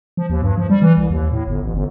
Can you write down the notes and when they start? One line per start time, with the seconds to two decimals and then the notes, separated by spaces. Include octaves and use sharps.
0.17 F3
0.30 D#2
0.42 G2
0.58 F3
0.70 G3
0.82 E3
0.98 C2
1.10 D#2
1.32 A2
1.47 G1
1.62 A1
1.74 G1